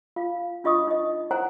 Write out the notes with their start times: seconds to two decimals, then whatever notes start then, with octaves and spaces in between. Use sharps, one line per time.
0.16 F4 F5
0.64 D4 F4 D#5 C#6 D#6
0.87 D#4 D#5
1.31 E4 B4 C5 F#5 G#5 A#5